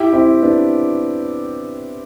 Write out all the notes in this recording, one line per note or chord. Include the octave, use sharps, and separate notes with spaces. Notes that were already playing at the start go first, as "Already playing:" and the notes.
Already playing: E4 G4
C4 E4
B3 D4